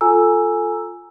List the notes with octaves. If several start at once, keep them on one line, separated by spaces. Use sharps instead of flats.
F4 A4 G#5 A#5 E6